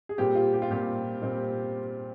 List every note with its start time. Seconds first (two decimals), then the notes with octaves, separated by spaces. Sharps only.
0.09 G#4
0.18 A#2 G3 C4 G4
0.35 F4
0.53 G4
0.62 F4
0.70 A#2 G3 C4 G4
1.22 A#2 G3 C4